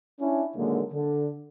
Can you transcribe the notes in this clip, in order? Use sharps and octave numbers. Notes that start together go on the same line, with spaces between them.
C#4 D4 E4
A#2 D3 D#3 F#3 G#3 A#3
D3